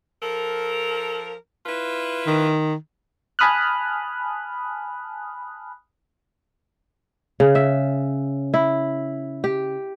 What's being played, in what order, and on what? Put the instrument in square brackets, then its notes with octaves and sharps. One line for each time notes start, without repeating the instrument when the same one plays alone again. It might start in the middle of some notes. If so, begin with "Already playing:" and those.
[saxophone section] F3 A4 A#4
E4 F4 B4
[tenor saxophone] D#3
[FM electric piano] G#5 A5 B5 D#6 F6 F#6
[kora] C#3
E5
E4
G4